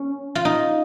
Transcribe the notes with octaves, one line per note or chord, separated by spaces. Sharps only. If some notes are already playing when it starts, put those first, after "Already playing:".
Already playing: C#4
F4
D#4